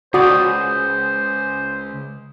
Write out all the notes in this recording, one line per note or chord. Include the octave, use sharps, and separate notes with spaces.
C#2 F#4 C5 D5 D#6